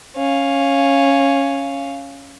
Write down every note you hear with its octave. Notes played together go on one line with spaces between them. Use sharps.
C#4 F5